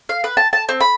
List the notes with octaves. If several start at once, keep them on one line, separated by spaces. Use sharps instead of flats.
F5
B4
A5
A5
C4
B5